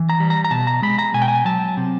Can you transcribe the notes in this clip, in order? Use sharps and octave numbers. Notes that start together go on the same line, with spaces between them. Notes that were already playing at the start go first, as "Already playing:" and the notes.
Already playing: E3
A#5
G3
A#5
A#5
B2 A5
A#5
G#3 B5
A#5
B2 G#5
G5
G#5
F#3 A5
C3